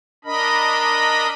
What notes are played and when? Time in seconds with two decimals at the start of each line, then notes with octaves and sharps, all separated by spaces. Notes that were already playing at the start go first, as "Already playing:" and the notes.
0.25 D4 A#4 D#5 B5